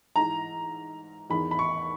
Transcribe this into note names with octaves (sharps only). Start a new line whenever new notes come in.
G#2 E3 A#5
E2 D#3 B5
B5
C#6